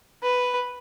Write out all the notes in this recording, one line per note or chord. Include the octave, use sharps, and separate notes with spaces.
B4